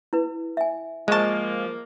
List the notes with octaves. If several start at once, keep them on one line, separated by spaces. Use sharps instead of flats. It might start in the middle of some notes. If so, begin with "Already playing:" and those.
E4 B4
E5 G#5
F3 G#3 A#3 D#5 A5 C#6